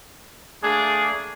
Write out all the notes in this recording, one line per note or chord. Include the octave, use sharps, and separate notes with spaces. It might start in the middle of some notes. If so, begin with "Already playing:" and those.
A3 A#3 D4 G#4